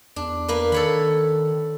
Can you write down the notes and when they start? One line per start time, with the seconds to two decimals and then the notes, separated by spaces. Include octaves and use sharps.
0.16 E2 D4
0.48 A#3 B4
0.72 D#3 A4 C#5 B5